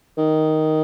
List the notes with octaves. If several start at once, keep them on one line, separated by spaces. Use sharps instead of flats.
D#3